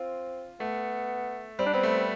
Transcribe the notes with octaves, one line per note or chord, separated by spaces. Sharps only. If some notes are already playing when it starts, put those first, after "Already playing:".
Already playing: C4 F4
A3 B3
G3 C4
D4
B3 C4
A3